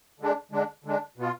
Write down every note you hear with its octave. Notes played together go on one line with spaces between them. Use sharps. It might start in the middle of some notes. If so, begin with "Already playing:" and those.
D3 G#3 D4
D3 G#3 D4
D3 G#3 D4
B2 B3 F4